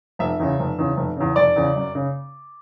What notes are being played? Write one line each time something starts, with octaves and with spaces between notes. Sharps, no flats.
F1 E5
E2 C#3
F1
E2 C#3
F1
E2 C#3
F1 D5
E2 C#3
F#2
C#3